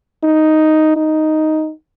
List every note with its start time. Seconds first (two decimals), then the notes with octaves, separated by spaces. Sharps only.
0.24 D#4
0.96 D#4